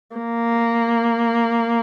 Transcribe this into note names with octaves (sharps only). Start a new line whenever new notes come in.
A#3